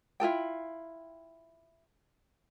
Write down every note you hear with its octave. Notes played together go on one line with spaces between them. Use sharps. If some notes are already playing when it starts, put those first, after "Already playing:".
E4 F4 A4 G5